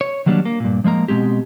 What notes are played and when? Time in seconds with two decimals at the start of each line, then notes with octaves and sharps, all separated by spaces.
0.01 C#5
0.26 D#3 F#3 G3 A#3 B3 D4
0.45 A#3
0.60 G2 A#2
0.84 F3 G#3 A#3 A#5
1.08 B2 D3 G#3 C4 G4